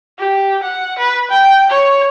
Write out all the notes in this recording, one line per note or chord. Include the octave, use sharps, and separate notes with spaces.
G4
F#5
B4
G5
C#5